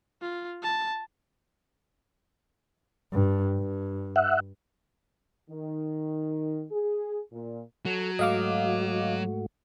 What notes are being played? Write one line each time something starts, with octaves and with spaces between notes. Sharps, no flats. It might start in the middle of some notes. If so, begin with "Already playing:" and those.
F4
A5
G2
G2
E5 F#5
D#3
G#4
A#2
F#3 A4
G#2 A3 F#4 D#5 F5 D6